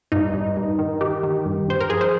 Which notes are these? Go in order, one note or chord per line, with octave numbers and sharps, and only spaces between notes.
G2 D#4
G2
G2
D#3
D#3 G4
D#3
G2
G2 C5
A#4
F3 G#4
C5